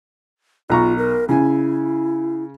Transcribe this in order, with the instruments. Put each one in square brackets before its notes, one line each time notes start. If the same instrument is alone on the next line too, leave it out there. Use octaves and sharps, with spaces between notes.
[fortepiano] B1 A#5 C#6 [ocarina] F4
[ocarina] A#4
[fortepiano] C#3 G#5 [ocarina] E4